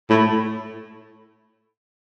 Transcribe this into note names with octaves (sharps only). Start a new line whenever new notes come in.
A2